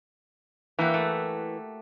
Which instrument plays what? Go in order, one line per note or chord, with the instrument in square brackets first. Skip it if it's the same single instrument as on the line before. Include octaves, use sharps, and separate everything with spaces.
[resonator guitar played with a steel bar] E3 [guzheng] A#3 F#4 G4
[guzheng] A3